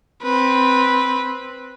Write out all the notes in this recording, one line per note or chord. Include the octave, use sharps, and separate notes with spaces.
C4 B4